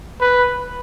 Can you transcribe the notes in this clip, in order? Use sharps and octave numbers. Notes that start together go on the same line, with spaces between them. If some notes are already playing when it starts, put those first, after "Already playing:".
B4